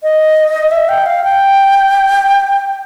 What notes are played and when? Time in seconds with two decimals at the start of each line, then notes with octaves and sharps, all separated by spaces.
0.03 D#5
0.71 E5
0.89 G5
1.06 F5
1.24 G5